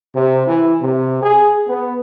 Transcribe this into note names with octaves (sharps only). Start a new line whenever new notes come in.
C3
E3
C3
G#4
B3